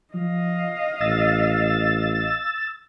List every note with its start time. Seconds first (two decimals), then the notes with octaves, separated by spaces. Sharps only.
0.14 F3 D#5 F5
1.01 A1 E6 A6